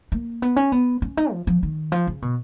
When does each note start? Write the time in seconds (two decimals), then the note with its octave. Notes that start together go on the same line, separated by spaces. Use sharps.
0.12 A#3
0.42 B3
0.56 C#4
0.72 B3
1.02 C#4
1.17 D#4
1.32 F3
1.47 F3
1.63 D#3
1.92 F3
2.07 C#3
2.22 B2